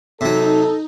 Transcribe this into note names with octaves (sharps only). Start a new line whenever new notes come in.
C3 F#3 D#4 A4